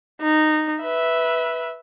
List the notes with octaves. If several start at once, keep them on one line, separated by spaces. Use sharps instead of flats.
D#4
B4 E5